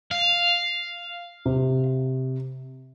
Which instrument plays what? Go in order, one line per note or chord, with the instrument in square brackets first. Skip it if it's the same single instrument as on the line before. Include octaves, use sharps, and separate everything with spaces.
[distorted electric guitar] F5
[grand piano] C3